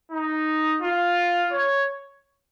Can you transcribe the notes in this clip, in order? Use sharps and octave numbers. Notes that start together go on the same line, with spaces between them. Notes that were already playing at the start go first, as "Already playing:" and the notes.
D#4
F4
C#5